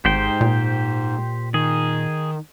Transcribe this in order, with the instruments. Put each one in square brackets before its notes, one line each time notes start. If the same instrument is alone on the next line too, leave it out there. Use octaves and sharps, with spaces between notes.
[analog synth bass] G#1 [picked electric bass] G#2 [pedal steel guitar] G4 C5 G5
[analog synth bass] A#2
[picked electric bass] D#3 [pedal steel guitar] G#4